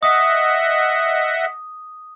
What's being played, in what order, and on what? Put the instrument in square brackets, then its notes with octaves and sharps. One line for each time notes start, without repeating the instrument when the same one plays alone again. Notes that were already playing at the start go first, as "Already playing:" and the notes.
[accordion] D#5 E5 F#5 [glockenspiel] D#6